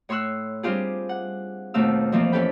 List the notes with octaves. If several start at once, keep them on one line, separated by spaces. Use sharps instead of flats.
A2 C#5 C6 C#6 E6 F#6
G3 C4 D4 F4 G4 G#4
F#5
D#2 B2 A3 C4 F5 E6
F2 E3 F3 A#3 C4
C#4 G4 A4 B4 G5 B5